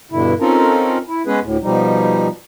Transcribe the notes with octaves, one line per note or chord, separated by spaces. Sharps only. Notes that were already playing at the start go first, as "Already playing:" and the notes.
G2 B2 D3 E4
C4 C#4 D#4 F4 A4 A#4
E4
G#3 B3 C#4 G#4 B4
D2 A2
B2 F3 G3 D#4